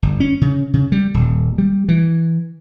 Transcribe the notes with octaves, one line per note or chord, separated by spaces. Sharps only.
G1
C#4
C#3
C#3
G3
D#1
G3
E3